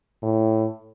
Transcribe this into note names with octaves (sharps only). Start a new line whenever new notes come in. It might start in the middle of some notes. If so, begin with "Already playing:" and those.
A2